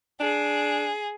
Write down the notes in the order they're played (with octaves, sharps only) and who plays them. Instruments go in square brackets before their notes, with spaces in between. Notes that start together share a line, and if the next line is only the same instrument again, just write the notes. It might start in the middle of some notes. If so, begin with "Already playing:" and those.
[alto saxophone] D4 [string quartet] G#4